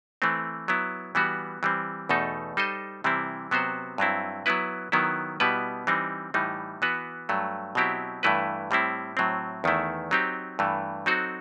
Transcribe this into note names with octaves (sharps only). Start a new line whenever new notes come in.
E3 A3 C4
F#3 B3 E4
E3 G3 B3 F#4
E3 G3 C4
E2 B2 A3 D#4 A4
G3 D#4 A4 C5 D#5
C3 E3 G3 C4 E4
C3 F#3 B3 F#4 C5
G2 F#3 C4 E4
F#3 B3 E4 B4
D#3 F#3 B3 E4
B2 G3 B3 E4 B4
E3 G3 C4 D#4
A2 E3 G3 D#4
E3 B3 F#4 B4
G2 F#3 A3
B2 F#3 C4 E4 G4
G2 E3 A3 E4 B4
A2 G3 C4 E4
A2 F#3 C4
E2 D#3 A3 E4
F#3 C4 D#4 G4
G2 E3 A3
F#3 C4 D#4 F#4 A4